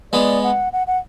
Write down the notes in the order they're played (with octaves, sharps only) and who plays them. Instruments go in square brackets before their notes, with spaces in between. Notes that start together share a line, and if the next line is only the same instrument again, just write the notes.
[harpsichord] G#3 B3 [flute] D5
[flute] F#5
F#5
F#5